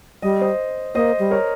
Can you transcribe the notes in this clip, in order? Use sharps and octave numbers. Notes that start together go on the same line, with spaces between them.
G3 D#5
C5 D#5
A#3 C5 D#5
G3
A#4 C#5